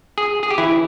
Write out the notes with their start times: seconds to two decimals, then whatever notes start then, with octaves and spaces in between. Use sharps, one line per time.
0.18 G#4
0.43 G#4
0.51 G4
0.58 E3 E4